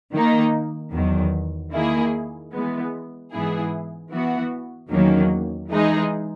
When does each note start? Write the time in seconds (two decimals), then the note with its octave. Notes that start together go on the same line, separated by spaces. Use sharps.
0.14 D#3 A#3 D#4
0.93 E2 D#3 F#3
1.73 D#3 A#3 E4 G#4
2.53 E3 G#3 B3
3.32 G#2 E3 B3 E4 G#4
4.12 E3 B3 F#4
4.91 E2 D#3 F#3 A#3 C#4
5.70 E3 G#3 D#4 G#4